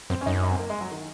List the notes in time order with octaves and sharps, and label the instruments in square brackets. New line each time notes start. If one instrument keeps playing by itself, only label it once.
[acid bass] F#2 [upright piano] C4
[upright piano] C#4
[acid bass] F#2 [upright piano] D#4
[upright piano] C#4
D#4
C4
A#3
G#3
F#3
D#3